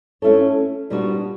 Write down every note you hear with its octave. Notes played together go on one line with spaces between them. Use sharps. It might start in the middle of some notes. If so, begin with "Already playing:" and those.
A3 C#4 E4 A4 C#5
A#2 G3 B3 D4 F#4